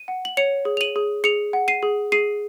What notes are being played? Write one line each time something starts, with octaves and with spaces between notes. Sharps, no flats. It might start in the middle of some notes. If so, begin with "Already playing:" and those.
Already playing: D#7
F#5
F#7
C#5 C#7 F7
G#4
F7
D#7 F#7
G#4
G#4 C#7 F7
F#5
C7 D#7
G#4
G#4 C7 D#7